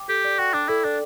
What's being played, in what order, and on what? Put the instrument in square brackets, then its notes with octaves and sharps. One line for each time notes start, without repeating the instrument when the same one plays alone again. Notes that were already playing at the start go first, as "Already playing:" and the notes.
Already playing: [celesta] G5 D6
[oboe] G4 [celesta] A4
[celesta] D5
[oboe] F#4 [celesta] G5
[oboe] D4 [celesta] D6
[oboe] E4 [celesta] A4
[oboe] D4 [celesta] D5